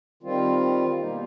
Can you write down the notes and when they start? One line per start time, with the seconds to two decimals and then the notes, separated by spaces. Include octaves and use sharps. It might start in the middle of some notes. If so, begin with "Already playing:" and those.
0.23 D#3 G3 C4 F4
0.99 B2 G3 A#3 D#4